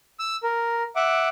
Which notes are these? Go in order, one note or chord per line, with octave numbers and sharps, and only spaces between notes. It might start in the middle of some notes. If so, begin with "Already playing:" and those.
E6
A#4
E5 F#5 D6